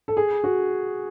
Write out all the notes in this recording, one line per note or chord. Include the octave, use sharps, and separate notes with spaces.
A4
G#4
F#4